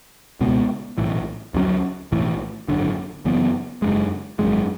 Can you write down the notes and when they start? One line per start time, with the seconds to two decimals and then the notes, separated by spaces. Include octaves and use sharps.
0.40 C#2 B2 G#3 B3
0.98 B1 A2 E3
1.54 D2 C#3 F#3 C#4
2.12 B1 A2 E3
2.68 G#1 F#2 D3
3.25 F#1 F#2 E3 B3
3.82 F#1 F#2 E3 G#3
4.39 G#1 F#2 D3 G#3